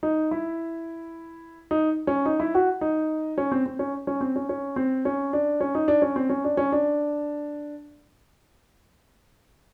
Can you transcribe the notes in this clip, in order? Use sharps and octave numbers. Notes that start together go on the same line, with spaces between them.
D#4
E4
D#4
C#4
D#4
E4
F#4
D#4
C#4
C4
C4
C#4
C#4
C4
C#4
C#4
C4
C#4
D4
C#4
D#4
D4
C#4
C4
C#4
D4
C#4
D4